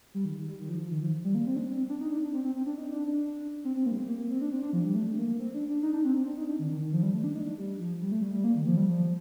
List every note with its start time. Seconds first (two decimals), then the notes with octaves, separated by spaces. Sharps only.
0.14 G3
0.25 D#3
0.47 G3
0.59 D#3
0.69 F3
0.80 F3
0.91 D#3
1.03 F3
1.24 G3
1.35 A#3
1.46 C4
1.56 D4
1.66 C4
1.90 D4
2.01 D#4
2.12 D4
2.22 D4
2.33 C4
2.44 C4
2.55 C4
2.66 D4
2.77 D#4
2.92 D4
3.06 D4
3.65 C4
3.76 C4
3.86 A#3
3.92 G3
3.97 A3
4.08 A#3
4.18 A#3
4.30 C4
4.41 D4
4.52 C4
4.62 D4
4.73 F3
4.84 G3
4.95 A3
5.06 A3
5.18 A#3
5.28 A#3
5.39 C4
5.54 D4
5.69 D4
5.83 D#4
5.93 D4
6.04 C4
6.16 C4
6.26 D4
6.37 D#4
6.49 D4
6.59 D#3
6.71 D#3
6.81 D#3
6.92 F3
7.03 G3
7.14 A3
7.24 D4
7.35 D#4
7.47 D4
7.58 G3
7.79 F3
8.01 G3
8.12 A3
8.22 G3
8.34 G3
8.44 A#3
8.56 D#3
8.67 F3
8.77 G3
8.88 F3